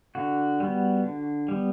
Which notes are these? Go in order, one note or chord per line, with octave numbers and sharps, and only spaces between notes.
D3 F#4
G3 B3
D3
G3 B3